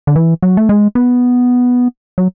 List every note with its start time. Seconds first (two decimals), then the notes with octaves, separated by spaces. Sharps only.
0.07 D3
0.16 E3
0.43 F#3
0.57 A3
0.69 G#3
0.95 B3
2.18 F#3